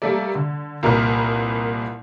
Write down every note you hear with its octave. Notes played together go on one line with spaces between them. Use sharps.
G3 A3 A#3 A4 D5
D3
C2 A#2 A#4 B4 F6